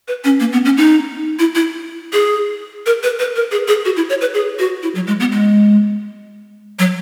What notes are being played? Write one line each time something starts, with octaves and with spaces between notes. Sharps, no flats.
B4
C#4
A#3
B3
C#4
D#4
E4
E4
G#4
A#4
B4
B4
A#4
G#4
G#4
F#4
E4
C#5
B4
G#4
F#4
E4
F#3
G#3
B3
G#3
F#3